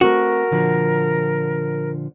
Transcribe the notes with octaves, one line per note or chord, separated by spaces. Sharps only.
A3 C4 F#4 A#4
A#2 D3 F3